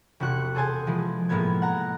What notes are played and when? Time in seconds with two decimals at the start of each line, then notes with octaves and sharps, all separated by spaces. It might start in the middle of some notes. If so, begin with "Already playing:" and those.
0.20 E1 C3 F#4 F#6 C#7
0.55 G#4 A4 C5 G#5 A5
0.87 E3 F3 G#3
1.29 A2 G#3 A#3 B3 G#6
1.62 F#5 A#5